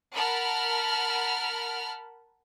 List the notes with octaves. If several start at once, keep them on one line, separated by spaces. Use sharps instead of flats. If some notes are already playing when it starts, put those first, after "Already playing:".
A#4 F#5 A5 B5 F6